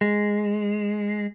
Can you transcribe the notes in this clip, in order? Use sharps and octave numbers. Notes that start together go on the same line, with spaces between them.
G#3